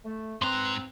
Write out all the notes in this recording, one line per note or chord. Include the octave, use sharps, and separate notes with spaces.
A3
G#2 C4 B4 A#5 C6